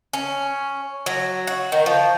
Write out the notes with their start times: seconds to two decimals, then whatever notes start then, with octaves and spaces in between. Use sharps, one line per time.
0.13 C#4
1.06 F#3
1.47 F#4
1.72 D#3
1.86 F3